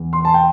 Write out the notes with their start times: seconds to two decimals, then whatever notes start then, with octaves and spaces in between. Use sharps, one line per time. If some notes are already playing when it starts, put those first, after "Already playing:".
Already playing: E2 E3
0.13 C6
0.25 A5
0.34 G5